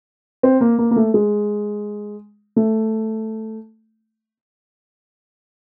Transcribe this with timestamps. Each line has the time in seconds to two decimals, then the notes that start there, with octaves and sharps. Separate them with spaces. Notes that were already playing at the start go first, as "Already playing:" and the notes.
0.43 C4
0.61 A#3
0.78 A#3
0.91 A#3
0.96 A3
1.14 G#3
2.56 A3